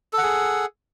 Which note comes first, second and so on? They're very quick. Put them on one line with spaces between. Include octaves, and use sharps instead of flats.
A4 F#5 G#4